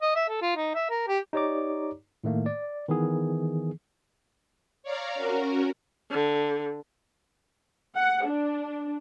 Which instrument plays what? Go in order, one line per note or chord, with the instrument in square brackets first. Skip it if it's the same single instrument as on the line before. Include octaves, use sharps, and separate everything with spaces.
[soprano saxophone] D#5
E5
A4
F4
D#4
E5
A#4
G4
[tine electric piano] D#4 G4 C#5 D5 A#5 D6
A2 D#3 A3 A#3
D5
D#3 E3 B3 G#4
[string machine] C#5 D5 F5 A#5
C#4 F#4 A#4
[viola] D3
[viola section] F#5
D4